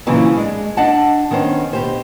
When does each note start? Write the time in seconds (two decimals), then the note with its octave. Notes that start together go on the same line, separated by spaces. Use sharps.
0.07 A#2 C#3 E3 F#3 C4
0.36 G#3 D4
0.77 D4 D#5 F#5 A5
1.31 D#3 B3 C#4 C5
1.73 B2 G4 C5